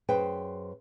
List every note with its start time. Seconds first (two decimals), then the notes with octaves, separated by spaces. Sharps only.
0.08 F#2 G#4 B4 C5 G5